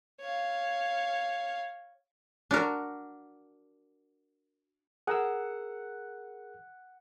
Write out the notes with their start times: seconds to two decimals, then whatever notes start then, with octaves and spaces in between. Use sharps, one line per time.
0.21 C#5 F5
2.51 D4 F#4 A#4
5.07 G#4 A#4 F#5 E6